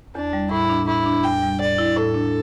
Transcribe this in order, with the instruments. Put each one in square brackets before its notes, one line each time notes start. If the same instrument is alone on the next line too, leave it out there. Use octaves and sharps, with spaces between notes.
[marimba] E2 [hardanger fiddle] D4
[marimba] G3
[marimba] A2 [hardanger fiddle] E4
[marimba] D4
[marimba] A2 [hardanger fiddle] E4
[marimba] D4
[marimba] E2 [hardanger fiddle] G5
[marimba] G3
[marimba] A2 [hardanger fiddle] D5
[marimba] E4
[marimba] A2 [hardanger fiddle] A4
[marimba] D4